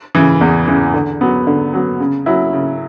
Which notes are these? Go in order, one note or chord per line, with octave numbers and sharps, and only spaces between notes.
C#3 E3
E2
C#3 E3
D3
F#3 B3
D3
F#3 B3
C#3
F#3 C#4 E4
C#3